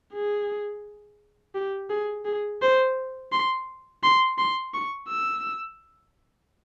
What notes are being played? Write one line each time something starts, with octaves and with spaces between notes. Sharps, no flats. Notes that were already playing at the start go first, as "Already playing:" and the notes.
G#4
G4
G#4
G#4
C5
C6
C6
C6
C#6
E6